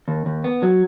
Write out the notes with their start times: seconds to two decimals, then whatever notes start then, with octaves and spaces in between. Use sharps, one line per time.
0.08 D#2
0.26 D#2
0.44 B3
0.63 F#3